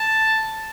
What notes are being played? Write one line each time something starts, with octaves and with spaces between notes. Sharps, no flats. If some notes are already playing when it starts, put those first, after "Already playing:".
Already playing: A5